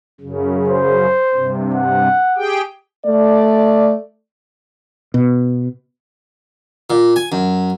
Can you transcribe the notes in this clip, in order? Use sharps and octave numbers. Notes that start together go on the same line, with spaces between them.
F#2 C#3
C5
G2 C3
F#5
G4 G#4 G5
A3 D5
B2
A#2
G#5
F#2